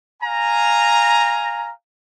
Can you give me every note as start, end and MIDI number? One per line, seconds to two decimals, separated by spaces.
0.22 1.69 77
0.22 1.69 80
0.22 1.69 82